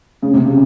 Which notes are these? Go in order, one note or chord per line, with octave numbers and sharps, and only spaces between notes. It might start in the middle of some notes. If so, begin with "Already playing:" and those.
C#3
C3
C#3